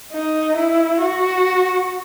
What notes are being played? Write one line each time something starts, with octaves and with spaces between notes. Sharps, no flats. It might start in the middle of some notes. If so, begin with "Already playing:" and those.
D#4
E4
F#4